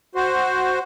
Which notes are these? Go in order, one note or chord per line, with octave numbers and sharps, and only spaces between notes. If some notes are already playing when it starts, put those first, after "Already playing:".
F#4 C5